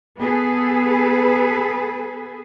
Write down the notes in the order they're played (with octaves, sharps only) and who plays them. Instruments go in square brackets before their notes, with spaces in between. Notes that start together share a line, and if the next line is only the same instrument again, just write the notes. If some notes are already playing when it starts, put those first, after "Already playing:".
[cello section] B3 G#4 A4 B4